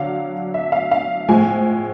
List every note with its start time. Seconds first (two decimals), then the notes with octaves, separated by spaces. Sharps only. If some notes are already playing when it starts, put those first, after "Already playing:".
Already playing: D3 F#3 F5
0.54 E5
0.72 F5
0.91 F5
1.28 A2 F3 G#3 G#5